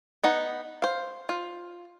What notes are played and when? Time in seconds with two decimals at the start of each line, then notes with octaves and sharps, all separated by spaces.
0.24 B3 D#4 F#5
0.82 C5 F5
1.29 F4